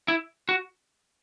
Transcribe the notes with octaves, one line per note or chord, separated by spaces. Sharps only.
E4
F#4